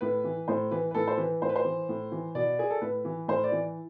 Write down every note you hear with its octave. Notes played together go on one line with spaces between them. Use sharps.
A2 B4
E3
A2 C5
E3 B4
B4
A2 A4
C5
E3 B4
A2 C5
B4
C5
E3
A2
E3
B2 D5
G#4
A4
A2 B4
E3
A2 C5
D5
E3